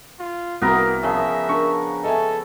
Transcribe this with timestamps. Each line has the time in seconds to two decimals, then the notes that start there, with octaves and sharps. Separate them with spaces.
0.20 F4
0.62 C2 A#3 B3 F#4 A#4 A#5
1.03 C#3 F3 E5
1.49 D4 A#4 C#6
2.04 A4 D#5 E5 G#5